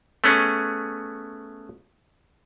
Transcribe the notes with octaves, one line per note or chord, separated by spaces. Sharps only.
A3 B3 C#4 G#4